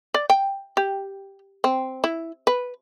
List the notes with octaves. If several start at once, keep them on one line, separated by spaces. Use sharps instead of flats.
D5
G5
G4
C4
E4
B4